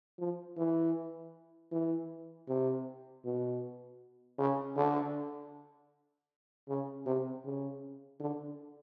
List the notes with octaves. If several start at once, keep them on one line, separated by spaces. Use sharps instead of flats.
F3
E3
E3
C3
B2
C#3
D3
C#3
C3
C#3
D3